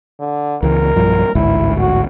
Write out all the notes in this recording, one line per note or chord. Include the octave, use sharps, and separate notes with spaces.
D3
C#2 E3 A#4
B1 G2 F3
A1 D2 G#2 E4
F#4